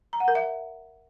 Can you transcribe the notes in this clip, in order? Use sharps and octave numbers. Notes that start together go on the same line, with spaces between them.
A#5
F#5
A#4
E5